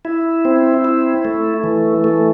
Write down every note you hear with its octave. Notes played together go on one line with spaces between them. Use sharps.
E4
C4
E4
A3
E3
A3